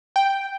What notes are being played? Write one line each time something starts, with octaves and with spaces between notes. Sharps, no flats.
G5